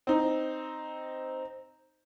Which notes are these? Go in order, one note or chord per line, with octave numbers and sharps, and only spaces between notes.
C4 D#4